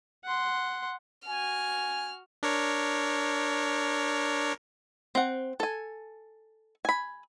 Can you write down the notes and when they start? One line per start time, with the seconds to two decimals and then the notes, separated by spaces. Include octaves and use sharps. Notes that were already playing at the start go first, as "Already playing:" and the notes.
0.24 F#5 C6
1.27 F#4 G#5 F6
2.43 D4 A#4 C#5
5.15 C4 F#5
5.60 A4 G#5
6.85 G#5 B5